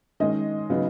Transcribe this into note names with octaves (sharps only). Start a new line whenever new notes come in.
D#3 G#3 C#4 D#5
C#3 F#3 B3 D#4